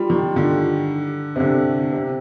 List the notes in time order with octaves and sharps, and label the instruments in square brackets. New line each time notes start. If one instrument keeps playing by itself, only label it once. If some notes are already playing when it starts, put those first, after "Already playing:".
Already playing: [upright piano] G3 [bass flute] F4
[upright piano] D#3
D3
C3
D3
C3